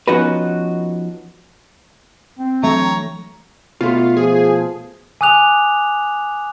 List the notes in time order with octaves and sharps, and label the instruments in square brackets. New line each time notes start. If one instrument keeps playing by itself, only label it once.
[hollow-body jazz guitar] F3 B3 C#4 D#4 F#4 B4
[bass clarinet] C4
[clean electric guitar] D3 E3 F#3 [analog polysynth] A3 [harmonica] C#5 A#5
[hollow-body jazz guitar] B2 A3 [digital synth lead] F4
[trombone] F3 [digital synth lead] G#4
[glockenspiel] G#5 D6 D#6 F#6 F7